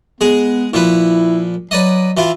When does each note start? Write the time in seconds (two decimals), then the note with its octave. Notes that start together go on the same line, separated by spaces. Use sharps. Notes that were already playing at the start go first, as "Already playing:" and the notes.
0.21 G#3 B3 G#4
0.74 A#2 F3 E4 B4
1.71 F#3 B4 D5 D#5
2.17 E3 E4 F4